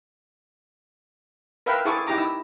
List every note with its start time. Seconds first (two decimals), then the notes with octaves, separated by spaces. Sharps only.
1.66 A#4 B4 E5 F5 G5
1.85 E4 G#4 A4 C5 C#6 D6
2.07 D#4 E4 G4 A#5 D6
2.18 E4 E6